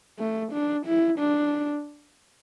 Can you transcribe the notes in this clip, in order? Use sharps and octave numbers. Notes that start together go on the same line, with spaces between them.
A3
D4
E4
D4